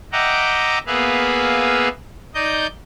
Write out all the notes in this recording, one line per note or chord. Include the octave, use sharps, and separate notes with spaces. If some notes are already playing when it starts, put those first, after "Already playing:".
D#5 E5 F#5 G5 A#5 D6
A#3 B3 G#4 B4 E5 F5
D#4 D5 D#5 G6